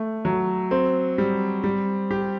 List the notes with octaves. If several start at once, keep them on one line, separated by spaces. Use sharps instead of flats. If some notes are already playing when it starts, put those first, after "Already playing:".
Already playing: A3
F#3
C4
G3
G3
G4